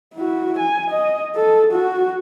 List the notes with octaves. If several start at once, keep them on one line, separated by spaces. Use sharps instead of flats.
E4 F#4
G#5
D#5
A4
F#4